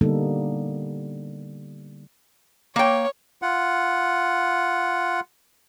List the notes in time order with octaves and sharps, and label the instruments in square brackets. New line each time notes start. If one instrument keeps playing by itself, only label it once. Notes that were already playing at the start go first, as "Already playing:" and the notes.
[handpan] D3 G3 A#3 B3 D#4 A4
[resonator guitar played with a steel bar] A#3 G5 [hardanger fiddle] C#5
[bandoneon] F4 F#5